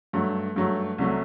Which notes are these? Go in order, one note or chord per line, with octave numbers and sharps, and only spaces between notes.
G2 F#3 A3
G2 F#3 A3
C2 C3 F#3 A3